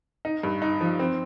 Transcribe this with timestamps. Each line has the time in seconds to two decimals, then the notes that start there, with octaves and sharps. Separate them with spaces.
0.25 D#4
0.43 G2
0.62 D#4
0.81 F3
0.99 C4